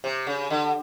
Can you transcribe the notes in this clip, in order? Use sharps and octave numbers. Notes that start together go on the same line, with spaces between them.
C3
C#3
D3